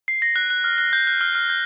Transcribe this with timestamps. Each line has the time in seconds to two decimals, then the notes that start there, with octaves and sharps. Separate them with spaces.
0.08 C7
0.22 A#6
0.36 F#6
0.50 F#6
0.64 F6
0.78 F#6
0.93 G6
1.07 F#6
1.21 F6
1.35 F6
1.50 G6